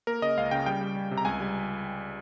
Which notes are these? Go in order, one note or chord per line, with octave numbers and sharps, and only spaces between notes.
A#3 A#4
C#3 D#5
C#2 F5
C#3 G5
G3 G5
G3
G3
C3
A#5
C#2 G#5
G3